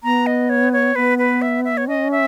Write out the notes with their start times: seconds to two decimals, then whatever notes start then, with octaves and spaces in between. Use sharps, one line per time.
0.03 B3 A#5
0.27 D#5
0.49 C#5
0.73 C#5
0.96 B3 B4
1.18 B4
1.42 E5
1.65 E5
1.77 C#5
1.88 C#4 D#5
2.11 E5